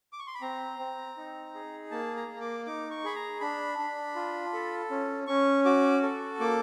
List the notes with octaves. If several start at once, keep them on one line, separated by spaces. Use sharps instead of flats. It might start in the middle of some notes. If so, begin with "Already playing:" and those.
D6
C#6
C6
B5
C4 A#5
C4
D#4
G#4
A#3 A5
A#5
A#3
D6
D#4 D6
C#6
G#4 B5
A#5
D4 B5
D4
F4
A4
C#4
C#4 C#6
F#4 D6
A4
A#3 D6